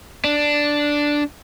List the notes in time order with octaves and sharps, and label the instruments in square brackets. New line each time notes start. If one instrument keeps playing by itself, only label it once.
[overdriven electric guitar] D4